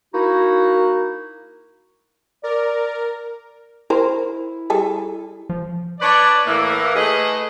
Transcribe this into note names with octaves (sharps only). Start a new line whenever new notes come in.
A#3 D#4 E4 F#4
A#4 D5
E4 A#4 C5
G3 G#4 A4
F3
D4 B4 C#5 D5
A2 E3 A#3
A3 G#4 B4 D#5